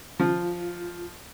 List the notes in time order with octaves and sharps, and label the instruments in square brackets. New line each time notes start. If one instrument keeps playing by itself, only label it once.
[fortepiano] F3 [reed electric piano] F4